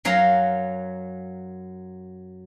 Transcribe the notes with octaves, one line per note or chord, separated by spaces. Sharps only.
F#2 F#3 F5 A#5